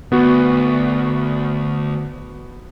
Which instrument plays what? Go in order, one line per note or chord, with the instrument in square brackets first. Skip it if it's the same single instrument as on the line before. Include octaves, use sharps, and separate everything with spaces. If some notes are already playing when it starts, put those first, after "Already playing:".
[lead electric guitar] D2 [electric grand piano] B3 F#4